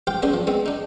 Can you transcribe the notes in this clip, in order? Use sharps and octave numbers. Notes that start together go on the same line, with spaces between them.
G4 C5 F5 G5
B3 C#4 D4 G#4 C5
F3
G#3 B3 C4
D4 D#4